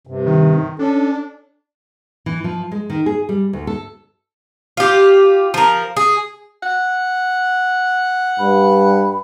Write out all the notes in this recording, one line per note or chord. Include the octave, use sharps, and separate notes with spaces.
G2 C3
D#3
C#4 D4 A4
E3
F3
G#3
D#3
G#4
G3
D2
A4
F4 G4
F3 A#4
G#4
F#5
G2 B5